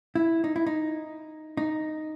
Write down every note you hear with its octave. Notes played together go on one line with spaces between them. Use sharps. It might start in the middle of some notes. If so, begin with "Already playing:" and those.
E4
D#4
E4
D#4
D#4